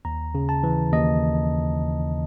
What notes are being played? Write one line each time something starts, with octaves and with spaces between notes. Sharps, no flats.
D#2 A#5
C#3
A5
E3
D#2 D#5